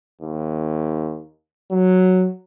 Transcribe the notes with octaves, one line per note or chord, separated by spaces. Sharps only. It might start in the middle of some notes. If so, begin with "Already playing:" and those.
D#2
F#3